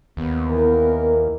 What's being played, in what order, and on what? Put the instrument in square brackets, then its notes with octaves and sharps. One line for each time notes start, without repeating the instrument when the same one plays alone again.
[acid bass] D#2 [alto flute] B3
[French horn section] E3 A#4